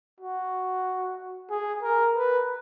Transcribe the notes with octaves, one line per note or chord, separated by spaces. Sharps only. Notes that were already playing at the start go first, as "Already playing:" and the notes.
F#4
G#4
A#4
B4